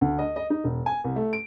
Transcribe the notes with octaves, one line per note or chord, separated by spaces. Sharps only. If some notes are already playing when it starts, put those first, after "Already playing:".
D2
D#5
D#5
D#4
E1
G#5
C2
A3
D7